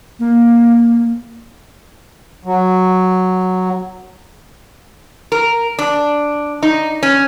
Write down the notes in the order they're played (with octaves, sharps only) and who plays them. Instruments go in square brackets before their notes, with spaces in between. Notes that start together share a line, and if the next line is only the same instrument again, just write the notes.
[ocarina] A#3
[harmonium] F#3
[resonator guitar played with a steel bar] A#4
D4
D#4
C#4